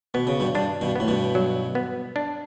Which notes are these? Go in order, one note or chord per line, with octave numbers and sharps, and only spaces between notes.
B2 B3
C#3
G2 B2
G2 D4
G2 B2
A2 B3
G2 B2
F#3
B3
D4